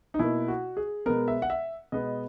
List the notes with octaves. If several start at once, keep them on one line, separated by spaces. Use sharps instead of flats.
D#4
B2 A#3 E4
F#4
G#4
B2 G#3 B3 A#4
E5
F#5
E5
B2 G#3 B3 D#5